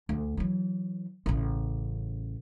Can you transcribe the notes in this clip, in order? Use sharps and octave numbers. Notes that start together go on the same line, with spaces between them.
D2
E3 F#3
A1 C#3